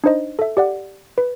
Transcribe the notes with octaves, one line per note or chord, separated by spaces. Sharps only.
D4 D#4 C5 D#5
A4 E5
G4 D5 F#5
B4